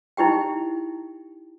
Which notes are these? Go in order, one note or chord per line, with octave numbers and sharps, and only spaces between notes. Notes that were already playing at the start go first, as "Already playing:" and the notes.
D#4 E4 G4 G5